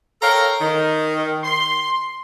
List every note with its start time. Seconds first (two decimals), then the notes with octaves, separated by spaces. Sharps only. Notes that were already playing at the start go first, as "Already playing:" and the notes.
0.22 A4 A#4 C#5 F5 G5 A#5
0.61 D#3
1.44 C6